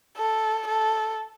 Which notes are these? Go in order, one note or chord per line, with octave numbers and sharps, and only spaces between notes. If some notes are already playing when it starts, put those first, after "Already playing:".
A4
A4